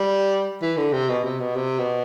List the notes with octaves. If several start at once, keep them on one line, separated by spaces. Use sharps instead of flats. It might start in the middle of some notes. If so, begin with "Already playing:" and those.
Already playing: G3
E3
D3
C3
B2
C3
B2
C3
B2